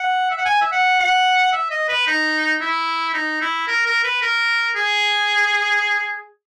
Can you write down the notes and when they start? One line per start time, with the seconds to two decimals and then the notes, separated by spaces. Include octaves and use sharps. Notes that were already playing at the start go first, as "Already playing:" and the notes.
Already playing: F#5
0.30 E5
0.38 F#5
0.45 G#5
0.61 E5
0.72 F#5
0.99 F#5
1.53 E5
1.71 D#5
1.88 B4
2.07 D#4
2.61 E4
3.14 D#4
3.41 E4
3.68 A#4
3.86 A#4
4.04 B4
4.22 A#4
4.76 G#4